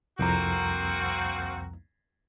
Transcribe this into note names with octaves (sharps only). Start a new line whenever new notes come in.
C2 F2 A#3 C4 F#4 A#5